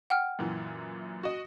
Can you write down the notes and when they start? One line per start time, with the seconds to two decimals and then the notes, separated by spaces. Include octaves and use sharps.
0.10 F#5 G5 F6
0.39 F#2 A#2 E3
1.23 F#4 D#5